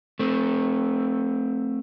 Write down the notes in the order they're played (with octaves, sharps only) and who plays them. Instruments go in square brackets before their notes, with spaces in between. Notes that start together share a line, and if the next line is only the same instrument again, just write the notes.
[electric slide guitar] A3 C4